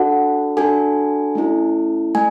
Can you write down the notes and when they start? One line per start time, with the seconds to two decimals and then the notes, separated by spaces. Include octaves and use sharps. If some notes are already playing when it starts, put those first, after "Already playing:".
Already playing: D4 F#4 A4 F#5
0.57 D4 F#4 A4 G#5
1.35 A3 C#4 E4 A4
2.15 A3 G#5